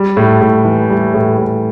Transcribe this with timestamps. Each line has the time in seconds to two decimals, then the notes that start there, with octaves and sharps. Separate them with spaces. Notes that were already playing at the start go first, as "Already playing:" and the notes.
Already playing: G3
0.17 A2
0.41 A2
0.64 E3
0.90 G3
1.14 A2
1.38 A2